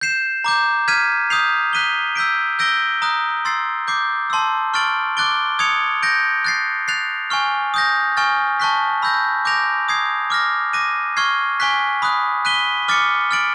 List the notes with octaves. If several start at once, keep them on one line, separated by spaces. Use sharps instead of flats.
G6 C7 E7
A#5 D6 G6
F6 G#6 B6 D#7
D#6 G6 C7 F7
F#6 B6 D#7 G7
E6 G6 B6 D7
E6 G6 A#6 D7 G7
A#5 D#6 F#6
C6 E6 A6 C7
D6 G6 C7
A5 C6 E6
C#6 F6 A6 D7 F#7
D6 F#6 A6 D7 G7
D#6 G#6 C#7 F7
G6 A#6 D7
F#6 A6 C7
F#6 A6 C7 F7
G#5 C#6 F6
D#6 G6 A#6
G#5 C#6 F6 A6
A5 C#6 F#6 B6
B5 E6 G6 A#6
D6 G6 A#6 D7 F7
D#6 G#6 C7
D6 F6 A#6
D6 F#6 A#6 D#7
C#6 F6 G#6 C7
G#5 C#6 F#6 B6
B5 D#6 F#6
F#6 B6 D#7 G7
D6 F6 A6 C#7
F6 A6 D7 F#7